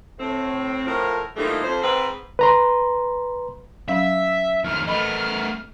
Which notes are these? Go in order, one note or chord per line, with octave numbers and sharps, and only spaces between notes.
A2 C4
A2 F3 A#4
E3 F3 G3 A3 A#3 D#4
F2 C5
G#2 C4 B4
B4 A#5 C6
F#3 C#4 E5 F5 E6
F2 D#3 F6
A3 B3 D#5 B5 F6